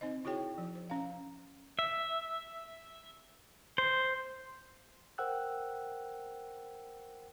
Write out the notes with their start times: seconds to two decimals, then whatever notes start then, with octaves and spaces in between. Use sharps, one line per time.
0.01 C4 D#4 C5 D#5
0.25 E4 F#4 G#4 C#5 G5
0.58 F3
0.75 C5
0.90 C#4 F5
1.79 E5
3.78 C5
5.18 A#4 C5 F#5 G5 E6 F#6